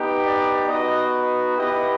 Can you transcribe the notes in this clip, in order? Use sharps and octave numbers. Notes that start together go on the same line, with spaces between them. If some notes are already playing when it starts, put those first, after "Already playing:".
Already playing: B3 D#4 G4
D5
B3 D#4 F#4 D#5
B3 E4 G4 D#5